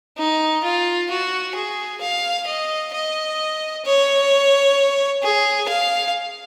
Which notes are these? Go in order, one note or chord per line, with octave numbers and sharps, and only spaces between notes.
D#4
F4
F#4
G#4
F5
D#5
D#5
C#5
G#4
F5